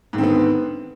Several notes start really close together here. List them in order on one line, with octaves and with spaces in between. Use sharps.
G#2 D#3 C4 D3 B3